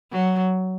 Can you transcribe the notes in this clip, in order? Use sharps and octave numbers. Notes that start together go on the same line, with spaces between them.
F#3